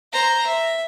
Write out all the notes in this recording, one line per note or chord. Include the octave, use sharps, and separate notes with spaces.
C5 A#5
E5